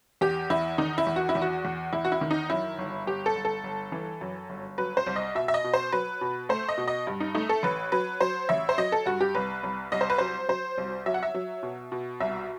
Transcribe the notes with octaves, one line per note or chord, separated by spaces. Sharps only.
E2 G4
E2 E4
D#3 D#4
E4
E2
F#4
E4
E2
F#4
E2
E2 E4
F#4
E4
D#3
D#4
F#2 E4
G1
G1 G4
A4
G1
A4
G1
E3
F#2
G1
F#3 B4
C5
C2
D#5
B2 E5
E5
D#5
B2
C5
F#3 B4
B2
A3 C5
D#5
B2
D#5
G2
D#4
A3 D#4
A4
A1 B4
F#3 B4
F#3 C5
A1 E5
C5
F#3 D#5
A4
G2 F#4
G4
C2 B4
C2
C2 D#5
C5
B4
F#3 C5
F#3 C5
C2
F#3 E5
F#5
E5
F#3
B2
B2
C2 E5